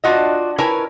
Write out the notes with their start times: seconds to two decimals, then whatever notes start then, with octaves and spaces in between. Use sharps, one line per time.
0.04 D4 F4 F#4 D#5
0.58 E4 A#4 B4 C#5 G#5 A5